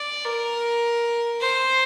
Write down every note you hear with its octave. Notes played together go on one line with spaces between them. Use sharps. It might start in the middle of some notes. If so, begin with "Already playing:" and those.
Already playing: D5
A#4
C5